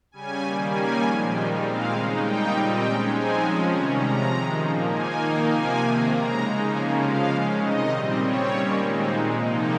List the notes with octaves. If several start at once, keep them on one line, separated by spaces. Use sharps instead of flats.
C#3 G3 C#4 G#5
D#3 G3 A#3
D#3 G3 A#3 C#4 G#5
A#2 F3 G#3
D#3 G3 C4 D#4 G5
A#2 G#3 C4 F5
C#3 G#3 D#4
A#2 G3 A#3 D#4 G5
A#2 G3 C4 D#4
D#3 G#3 C#4 G5
F3 G#3 C4 D#4 G#5
F3 G#3 C#4
C3 D#3 G3 C#4 A#5
C3 F3 G#3 A#5
D#3 G#3 D#4
A#2 F3 A#3 C#4
D#3 A#3 D#4 G#5
D#3 A#3 D#4
C3 F3 A#3 G#5
C3 D#3 A#3
C#3 G#3 C4 A#5
C#3 G#3 D#4
C#3 F3 A#3 C#4 G#5
C3 F3 G#3 D#4 F5
C#3 G#3 C#4
C3 D#3 G3 C4 D#4 D#5
A#2 G3 C4
C#3 G3 C4 C#5
D#3 G3 A#3 C#4
A#2 G#3 C4 D#4
A#2 G#3 D#4
C3 F3 A#3 D#4